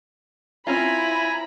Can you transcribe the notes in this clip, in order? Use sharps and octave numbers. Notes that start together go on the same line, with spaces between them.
C4 C#4 E4 F4 G#5 A#5 B5